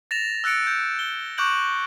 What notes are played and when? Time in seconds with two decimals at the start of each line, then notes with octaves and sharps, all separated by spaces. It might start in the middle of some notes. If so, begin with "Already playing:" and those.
0.11 A6 A#6 E7 F7
0.44 E6 F#6 A6 C#7 D7
0.67 G6
0.99 G7
1.38 C#6 D6 F#6 G6 D7 F#7